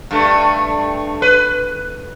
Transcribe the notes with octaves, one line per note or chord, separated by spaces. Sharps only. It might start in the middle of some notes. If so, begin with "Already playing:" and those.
G2 A3
B4